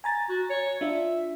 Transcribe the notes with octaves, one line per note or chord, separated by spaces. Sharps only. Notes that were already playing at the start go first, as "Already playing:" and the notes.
G#5 A#5 A6
F#4
C#5
D4 F4 E5